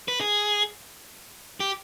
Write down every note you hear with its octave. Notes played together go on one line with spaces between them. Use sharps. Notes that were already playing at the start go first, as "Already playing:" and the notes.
B4
G#4
G4